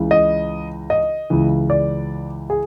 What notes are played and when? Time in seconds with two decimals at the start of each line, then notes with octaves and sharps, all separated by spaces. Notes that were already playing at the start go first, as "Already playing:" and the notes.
Already playing: C#2 C#3 E3
0.11 D#5
0.90 D#5
1.30 C#2 C#3 E3
1.70 D5
2.50 G#4